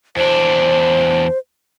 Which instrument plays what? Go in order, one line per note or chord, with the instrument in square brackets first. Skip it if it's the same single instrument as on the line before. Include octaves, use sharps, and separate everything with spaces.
[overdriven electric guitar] E2 D4 [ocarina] C5